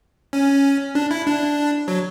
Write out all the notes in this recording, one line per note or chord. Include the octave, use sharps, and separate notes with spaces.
C#4
D4
E4
D4
F#3